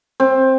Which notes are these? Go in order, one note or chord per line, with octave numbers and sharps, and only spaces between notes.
C4